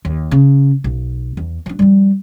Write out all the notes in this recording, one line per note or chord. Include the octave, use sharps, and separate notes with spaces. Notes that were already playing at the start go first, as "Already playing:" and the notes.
D#2
C#3
B1
E2
F3 D4
F3 G3